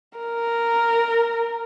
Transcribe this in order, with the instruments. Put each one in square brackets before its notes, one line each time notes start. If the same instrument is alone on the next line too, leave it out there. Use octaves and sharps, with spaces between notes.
[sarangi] A#4